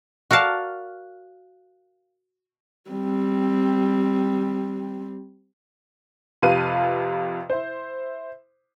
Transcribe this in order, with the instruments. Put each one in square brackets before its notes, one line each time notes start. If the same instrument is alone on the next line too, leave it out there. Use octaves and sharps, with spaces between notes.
[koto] F#4 A#4 D5 F5 A5
[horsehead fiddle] G3 C4
[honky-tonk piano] F2 C3 B4 F5 D#7
E4 C5